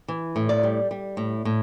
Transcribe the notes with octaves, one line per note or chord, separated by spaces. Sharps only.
E3
A2
D5
G3
G3
A2
A2